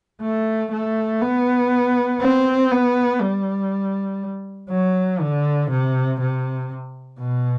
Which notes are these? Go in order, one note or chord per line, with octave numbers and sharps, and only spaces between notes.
A3
A3
B3
C4
B3
G3
F#3
D3
C3
C3
B2